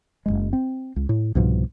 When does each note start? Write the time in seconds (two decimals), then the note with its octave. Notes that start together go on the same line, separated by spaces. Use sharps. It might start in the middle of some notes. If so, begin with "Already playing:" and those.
0.26 F#1 D#2 G#3
0.53 C4
0.96 C#2
1.09 A2
1.35 C2 G#2 B2 F3